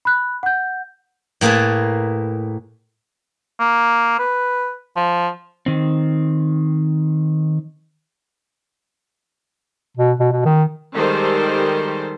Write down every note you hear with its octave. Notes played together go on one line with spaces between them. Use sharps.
B5 F#6
F#5 G6
A2 A#3 G#4 B4 A5
A#3
B4
F3
D#3 C4
B2
B2
B2
D#3
D#3 G3 G#3 G4 A4 C5